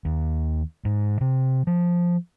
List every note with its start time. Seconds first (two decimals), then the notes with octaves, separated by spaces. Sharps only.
0.05 D#2
0.85 G#2
1.21 C3
1.67 F3